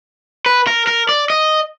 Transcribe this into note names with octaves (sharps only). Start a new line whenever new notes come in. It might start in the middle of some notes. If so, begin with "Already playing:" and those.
B4
A#4
A#4
D5
D#5